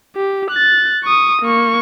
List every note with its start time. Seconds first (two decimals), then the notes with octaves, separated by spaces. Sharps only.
0.16 G4
0.50 F#6 A6
1.04 C#6 D#6
1.42 A#3 C#6